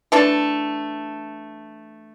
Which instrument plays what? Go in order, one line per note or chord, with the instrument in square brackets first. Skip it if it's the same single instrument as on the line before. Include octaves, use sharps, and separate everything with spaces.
[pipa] E3 A3 D4